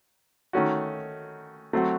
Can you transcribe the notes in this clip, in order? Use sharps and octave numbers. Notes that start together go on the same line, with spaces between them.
D#3 A3 C#4 F#4
F#3 A3 C4 F#4